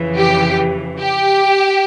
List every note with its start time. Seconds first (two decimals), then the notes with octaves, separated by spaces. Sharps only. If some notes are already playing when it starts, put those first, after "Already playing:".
Already playing: F2 C#3 E3
0.17 G4
0.99 G4